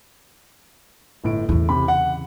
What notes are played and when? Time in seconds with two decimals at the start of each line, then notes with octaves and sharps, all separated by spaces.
1.24 G1 A2 D7
1.49 E2 A2 C#3
1.69 C3 B5
1.88 F#5